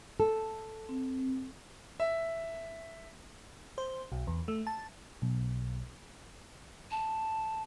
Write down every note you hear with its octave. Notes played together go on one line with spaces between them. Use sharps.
A4
C4
E5
C5
B1
E2
A3
A5
B1
A5